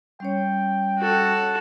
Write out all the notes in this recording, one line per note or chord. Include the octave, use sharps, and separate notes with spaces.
G3 C#4 C#5 G5
F#4 A4